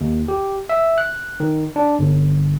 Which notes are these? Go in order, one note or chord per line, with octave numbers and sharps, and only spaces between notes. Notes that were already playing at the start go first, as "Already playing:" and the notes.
D#2
G4
E5
F#6
D#3
D4
G1